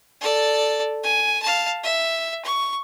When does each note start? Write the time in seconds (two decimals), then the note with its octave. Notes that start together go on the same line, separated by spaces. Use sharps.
0.21 A4 D5
1.03 G#5
1.42 F5 A5
1.83 E5
2.45 C#6